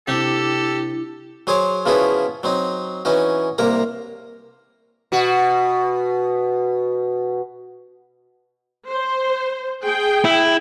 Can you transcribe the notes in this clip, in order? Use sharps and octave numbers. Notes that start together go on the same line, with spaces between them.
C3 D4 E4 G4 A4
F#3 G#4 C5 C#5 C6 D6
C#3 F3 B3 E4 F#4 G#4
F#3 C4 D#4
E3 C#4 D#4 F#4
C2 C3 A#3 A#4 A#5
B2 F#4
C5
G#4 G5
E4